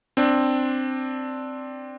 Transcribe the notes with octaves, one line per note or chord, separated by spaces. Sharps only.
C4 D4